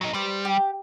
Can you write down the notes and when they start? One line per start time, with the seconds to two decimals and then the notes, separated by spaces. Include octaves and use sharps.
0.01 F#3 D#4
0.14 G3 B4 C5
0.45 G4